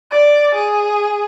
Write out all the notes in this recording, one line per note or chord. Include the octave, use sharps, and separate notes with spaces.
D5
G#4